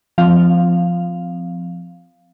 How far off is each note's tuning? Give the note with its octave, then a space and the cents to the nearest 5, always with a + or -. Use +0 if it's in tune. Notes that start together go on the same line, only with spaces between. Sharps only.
F3 +0 C4 -25 F5 +0